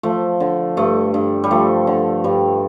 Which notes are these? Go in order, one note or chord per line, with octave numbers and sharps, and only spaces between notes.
F3 A3
D3
G2 A3
G2
G3
F3 A3
D3
G2 G3